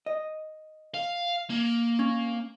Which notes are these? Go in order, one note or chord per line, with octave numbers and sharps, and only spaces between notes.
D#5
F5
A#3
C#4